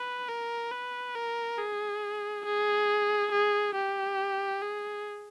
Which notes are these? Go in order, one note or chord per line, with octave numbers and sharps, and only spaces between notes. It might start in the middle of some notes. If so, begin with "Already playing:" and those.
Already playing: B4
A#4
B4
A#4
G#4
G#4
G#4
G4
G#4